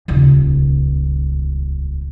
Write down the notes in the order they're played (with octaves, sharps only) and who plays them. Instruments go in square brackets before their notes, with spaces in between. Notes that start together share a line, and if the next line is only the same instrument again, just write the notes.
[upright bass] D#1 C#2